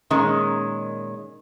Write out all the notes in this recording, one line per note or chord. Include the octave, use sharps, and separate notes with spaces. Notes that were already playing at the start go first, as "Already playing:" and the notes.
A#2 D#3 G#3 C#4